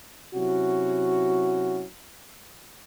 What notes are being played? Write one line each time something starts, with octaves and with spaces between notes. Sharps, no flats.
C3 F#3 C#4 E4 F#4